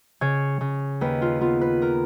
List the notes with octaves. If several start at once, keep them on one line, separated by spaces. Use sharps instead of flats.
C#3 C#5
C#3
D#2 B4
F4
B3 F4
B4
A#4